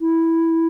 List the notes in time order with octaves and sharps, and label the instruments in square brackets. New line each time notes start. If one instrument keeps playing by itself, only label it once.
[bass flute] E4